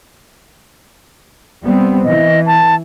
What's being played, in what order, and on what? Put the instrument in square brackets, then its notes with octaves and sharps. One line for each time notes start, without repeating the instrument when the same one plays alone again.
[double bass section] G3 B3 C4
[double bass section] E3 [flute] D#5
[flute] A5